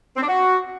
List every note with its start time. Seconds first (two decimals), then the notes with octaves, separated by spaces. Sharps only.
0.16 C4
0.22 D4
0.28 F#4